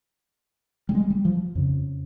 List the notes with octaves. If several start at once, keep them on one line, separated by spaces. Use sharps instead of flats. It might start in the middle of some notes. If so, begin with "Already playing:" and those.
G3
G#3
G3
F3
F2 C#3